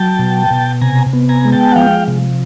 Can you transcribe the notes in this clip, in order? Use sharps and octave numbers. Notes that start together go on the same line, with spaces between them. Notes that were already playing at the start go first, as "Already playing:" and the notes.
Already playing: F#3 G5 A5
B2
B2
C3 G#5 A#5
B3
G#5 A#5
G#3
G5 A5
F#5
F3 F5 G5
C3